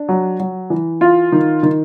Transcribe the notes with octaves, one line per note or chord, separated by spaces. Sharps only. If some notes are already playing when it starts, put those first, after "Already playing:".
Already playing: D4
F#3
F#3
E3
F4
D#3
D#3